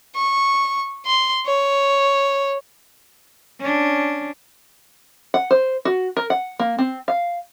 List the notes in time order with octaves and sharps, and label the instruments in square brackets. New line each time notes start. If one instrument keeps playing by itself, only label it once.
[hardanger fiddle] C#6
C6
C#5
[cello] C#4 D4
[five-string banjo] F#5
C5
F#4
A#4
F#5
A#3
C4
F5